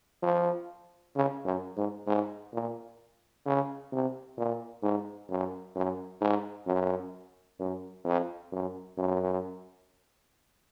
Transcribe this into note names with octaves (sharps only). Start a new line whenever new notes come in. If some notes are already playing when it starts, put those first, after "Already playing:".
F3
C#3
F#2
G#2
G#2
A#2
C#3
C3
A#2
G#2
F#2
F#2
G#2
F#2
F#2
F2
F#2
F#2